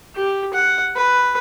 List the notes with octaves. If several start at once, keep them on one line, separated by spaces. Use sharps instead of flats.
G4
F#5
B4